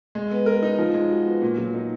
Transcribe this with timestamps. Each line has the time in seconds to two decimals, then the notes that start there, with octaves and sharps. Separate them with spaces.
0.15 G#3
0.31 B3
0.46 A#4
0.63 D#4
0.78 F3
0.94 G#3
1.11 F#4
1.26 B3
1.42 A#2
1.58 F#3
1.74 D#4